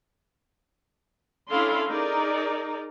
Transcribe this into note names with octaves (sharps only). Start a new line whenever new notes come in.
C#4 D4 E4 A4 F5 C6
D#4 G#4 A#4 D5